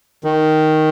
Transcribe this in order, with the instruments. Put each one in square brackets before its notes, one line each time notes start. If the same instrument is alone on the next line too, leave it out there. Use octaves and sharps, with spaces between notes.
[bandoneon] D#3